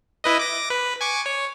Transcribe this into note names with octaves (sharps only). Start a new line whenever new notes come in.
E4 B4 D#5
D6 A#6
B4
G#5 C#6 D6
C#5